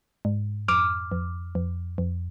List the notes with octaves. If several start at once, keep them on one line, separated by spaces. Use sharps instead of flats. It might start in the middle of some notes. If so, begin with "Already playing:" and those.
G#2
F2 D6 F6
F2
F2
F2